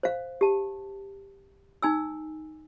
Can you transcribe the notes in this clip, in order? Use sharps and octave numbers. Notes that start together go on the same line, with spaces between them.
C5 F5
G4 A5
D#4 G#5 E6